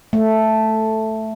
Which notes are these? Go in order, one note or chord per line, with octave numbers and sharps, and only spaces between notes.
A3